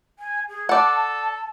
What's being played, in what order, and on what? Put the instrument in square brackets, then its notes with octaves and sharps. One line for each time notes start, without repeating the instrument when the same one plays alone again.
[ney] G#5
G#4
[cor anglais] A4 [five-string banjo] D5 F#5 [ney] A5